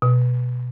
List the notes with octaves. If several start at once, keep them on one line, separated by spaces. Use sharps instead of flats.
B2